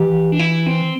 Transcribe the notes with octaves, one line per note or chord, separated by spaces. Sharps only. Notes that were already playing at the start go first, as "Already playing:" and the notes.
Already playing: E3 G4
D4
E4
C4